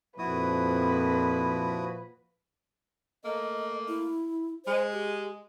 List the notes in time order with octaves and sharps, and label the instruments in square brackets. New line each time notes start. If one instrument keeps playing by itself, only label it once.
[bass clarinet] F2 [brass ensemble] A#2 F3 [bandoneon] E4 F#4 D#6 [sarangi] B4
[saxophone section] A3 A#3 [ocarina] D#5
[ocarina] E4
[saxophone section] G#3 [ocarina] C5
[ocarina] G4